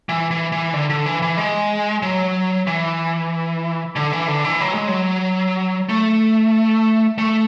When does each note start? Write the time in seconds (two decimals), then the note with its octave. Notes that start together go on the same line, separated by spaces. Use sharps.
0.09 E3
0.31 E3
0.52 E3
0.73 D3
0.90 D3
1.06 E3
1.22 E3
1.38 G#3
2.03 F#3
2.67 E3
3.96 D3
4.12 E3
4.28 D3
4.44 E3
4.61 F#3
4.74 G#3
4.88 F#3
5.89 A3
7.18 A3